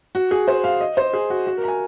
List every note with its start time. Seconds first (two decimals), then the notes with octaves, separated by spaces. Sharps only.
0.15 F#4
0.31 G#4
0.48 C5
0.64 F5
0.80 D#5
0.97 C5
1.13 G#4
1.30 F#4
1.47 F#4
1.57 A#4
1.64 A#5
1.68 G#5